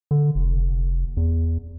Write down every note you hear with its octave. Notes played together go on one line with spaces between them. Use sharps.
D3
F1
E2